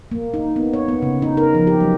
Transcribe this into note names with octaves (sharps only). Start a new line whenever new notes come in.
A#3
D#4
B3
C#5
B3
C#3
D#4
A#4
F3
G4
F#3